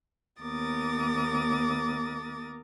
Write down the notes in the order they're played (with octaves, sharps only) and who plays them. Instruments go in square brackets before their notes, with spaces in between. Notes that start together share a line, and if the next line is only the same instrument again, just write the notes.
[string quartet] D#2 B3 A#4 D6 D#6 A6